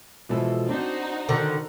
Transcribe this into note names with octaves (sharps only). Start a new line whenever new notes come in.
B2 E3 F3 G#3 A4
C4 D4 D#4 F#4 C5
D3 D#3 A4 A#4 F#5